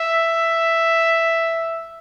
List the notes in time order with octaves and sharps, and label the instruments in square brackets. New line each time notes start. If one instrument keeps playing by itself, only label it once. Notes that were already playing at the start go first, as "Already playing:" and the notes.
Already playing: [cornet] E5